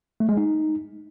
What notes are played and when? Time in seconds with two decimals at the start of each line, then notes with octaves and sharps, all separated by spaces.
0.20 A3
0.29 G#3
0.37 D#4